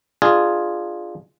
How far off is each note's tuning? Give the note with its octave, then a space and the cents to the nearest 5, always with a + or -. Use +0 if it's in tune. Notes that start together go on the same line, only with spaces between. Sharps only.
D4 +25 F4 +0 G#4 +0